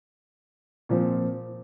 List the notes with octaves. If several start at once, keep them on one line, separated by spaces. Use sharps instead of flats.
A#2 F3 C4